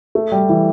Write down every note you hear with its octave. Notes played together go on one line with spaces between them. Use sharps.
A3
G3
E3